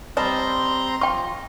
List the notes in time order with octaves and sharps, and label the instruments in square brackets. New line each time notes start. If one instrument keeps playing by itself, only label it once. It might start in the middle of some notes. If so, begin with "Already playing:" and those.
[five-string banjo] G3 D#5 A5 [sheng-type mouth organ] C4 A#5 C6
[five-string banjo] F4 [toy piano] G5 C#6